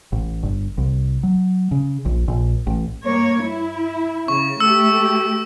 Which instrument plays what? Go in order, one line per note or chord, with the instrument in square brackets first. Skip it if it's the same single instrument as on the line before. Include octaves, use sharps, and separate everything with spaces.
[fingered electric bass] A1
G1
C2
F#3
C#3
A#1
A#1
A1
[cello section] G2 A#3 C#5
E4
[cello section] C#3 [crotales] C#6
[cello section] A3 G4 [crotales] E6